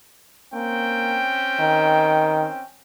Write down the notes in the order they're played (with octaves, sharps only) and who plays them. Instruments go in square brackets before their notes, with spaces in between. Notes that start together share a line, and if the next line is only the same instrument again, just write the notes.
[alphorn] A#3 [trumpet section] C4 C#4 G5
[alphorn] D#3